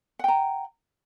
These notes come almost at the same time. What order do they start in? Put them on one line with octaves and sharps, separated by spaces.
F#5 G5 A#5